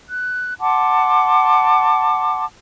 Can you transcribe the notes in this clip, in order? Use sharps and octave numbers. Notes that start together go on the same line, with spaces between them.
F#6
F#5 A5 C6 D6